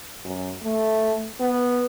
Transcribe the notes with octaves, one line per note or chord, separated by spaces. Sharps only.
F#2
A3
B3